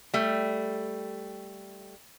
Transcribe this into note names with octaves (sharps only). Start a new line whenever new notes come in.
G3 A3